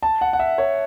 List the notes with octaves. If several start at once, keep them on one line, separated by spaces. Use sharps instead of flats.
A5
F#5
F#5
E5
C#5